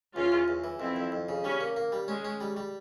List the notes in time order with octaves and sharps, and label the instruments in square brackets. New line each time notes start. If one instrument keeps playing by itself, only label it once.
[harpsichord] E2 [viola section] C#4 F4
[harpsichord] E2
E2
E3
[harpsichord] F2 [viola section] C4 E4
[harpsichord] F2
F2
C#3
[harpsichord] G3 [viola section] C#4
[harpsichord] A#3
A#3
G3
[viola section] G#3 [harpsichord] C#4
[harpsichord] C#4
G3
G3